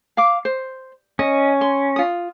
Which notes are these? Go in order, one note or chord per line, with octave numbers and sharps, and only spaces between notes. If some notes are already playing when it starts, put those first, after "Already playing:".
F5 D6
C5
C#4 D#5
C6
F4 D#6